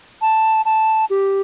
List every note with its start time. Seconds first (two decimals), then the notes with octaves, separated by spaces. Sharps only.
0.22 A5
0.65 A5
1.10 G4